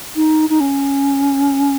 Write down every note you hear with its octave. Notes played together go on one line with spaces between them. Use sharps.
D#4
D#4
C#4